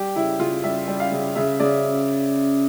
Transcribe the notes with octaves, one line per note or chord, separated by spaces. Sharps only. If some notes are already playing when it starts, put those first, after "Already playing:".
Already playing: G3 G4
C#3 E4
C#3 F4
G3 E5
G3
F5
C#3
C#3 E5
C#3 D5